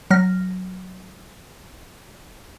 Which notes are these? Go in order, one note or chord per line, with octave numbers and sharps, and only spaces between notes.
F#3 F6 A#6